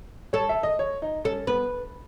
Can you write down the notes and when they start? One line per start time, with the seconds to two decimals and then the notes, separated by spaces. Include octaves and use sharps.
0.33 A4 C#5
0.49 E5
0.63 D#5
0.79 C#5
1.02 D#4
1.24 C#4 A4
1.47 B3 B4